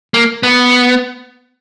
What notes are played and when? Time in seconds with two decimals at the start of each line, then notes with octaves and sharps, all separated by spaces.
0.14 A#3
0.43 B3